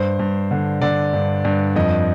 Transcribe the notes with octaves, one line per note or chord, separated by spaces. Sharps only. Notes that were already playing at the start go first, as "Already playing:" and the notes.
Already playing: G2 C5
G2
D3
D3 D5
G2
G2
F2 D#5